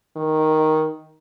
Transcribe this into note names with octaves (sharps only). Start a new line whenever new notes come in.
D#3